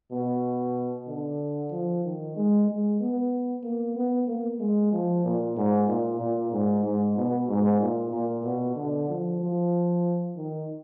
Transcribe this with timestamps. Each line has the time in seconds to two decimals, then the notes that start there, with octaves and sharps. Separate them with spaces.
0.11 B2
1.07 D3
1.71 F3
2.04 D#3
2.36 G#3
2.68 G#3
3.00 B3
3.64 A#3
3.96 B3
4.28 A#3
4.60 G#3
4.92 F3
5.24 A#2
5.57 G#2
5.88 A#2
6.19 A#2
6.52 G#2
6.84 G#2
7.17 B2
7.48 G#2
7.80 A#2
8.12 A#2
8.44 B2
8.76 D3
9.09 F3
9.40 F3
10.36 D#3